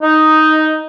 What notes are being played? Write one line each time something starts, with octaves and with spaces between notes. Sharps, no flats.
D#4